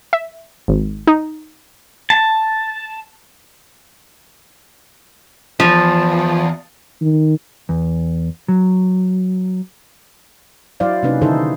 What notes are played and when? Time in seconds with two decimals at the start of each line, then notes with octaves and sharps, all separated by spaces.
0.13 E5
0.68 G#1
1.07 D#4
2.10 A5
5.60 E2 G#2 F3
7.01 D#3
7.69 E2
8.48 F#3
10.80 F#3 E4 C5 D5 F5
11.03 C3 A#3 C#4 D#4 B4
11.22 D3 D#3 D#4 E4 A4 C5